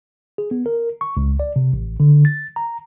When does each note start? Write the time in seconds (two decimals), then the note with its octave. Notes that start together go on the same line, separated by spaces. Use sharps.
0.38 G#4
0.51 B3
0.66 A#4
1.01 C#6
1.17 C#2
1.40 D5
1.56 C3
1.73 A1
2.00 D3
2.25 A6
2.56 A#5